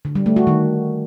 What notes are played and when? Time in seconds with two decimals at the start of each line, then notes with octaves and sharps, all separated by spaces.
0.05 D3
0.15 G3
0.26 A3
0.36 F#4
0.47 D#3